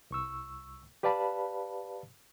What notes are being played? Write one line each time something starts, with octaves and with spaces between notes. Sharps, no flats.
C2 C#6 E6
G4 B4 D5 F5 A5 B5